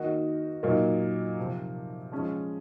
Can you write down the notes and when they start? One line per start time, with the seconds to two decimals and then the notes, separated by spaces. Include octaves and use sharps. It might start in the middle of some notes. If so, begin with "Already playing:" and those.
Already playing: D#3 A#3 D#4 F#4
0.63 A#2 F#3 A#3 D#4
1.37 C3 F3 C4
2.12 F3 G#3 C#4